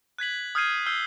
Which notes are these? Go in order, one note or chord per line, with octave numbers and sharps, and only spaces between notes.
F#6 G#6 B6 F#7
D#6 F6 G6 G#6 C7 D#7
E6 F6 G6 C7 G7